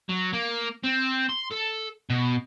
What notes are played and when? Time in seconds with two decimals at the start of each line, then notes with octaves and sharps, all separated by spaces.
0.09 F#3
0.33 A#3
0.84 C4
1.29 C6
1.51 A4
2.10 B2